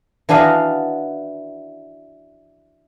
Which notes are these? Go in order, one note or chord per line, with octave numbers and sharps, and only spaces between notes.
E3 D4 F#4 D#5 F5 A#5